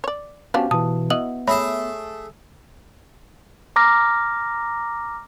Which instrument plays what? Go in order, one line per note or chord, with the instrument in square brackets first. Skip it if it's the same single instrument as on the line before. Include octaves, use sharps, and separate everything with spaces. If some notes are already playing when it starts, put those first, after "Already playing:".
[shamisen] C#5 D5
[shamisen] F3 G3 D4 [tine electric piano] B3 C#4 F#4 [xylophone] F5
[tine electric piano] B2 E3 [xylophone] A5 D#6
[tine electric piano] B3 [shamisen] E4 F#4 D#5 [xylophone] F#7
[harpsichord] A3 G#4 A5 [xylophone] C#5 E5 B5
[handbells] A#5 D6 F6 A#6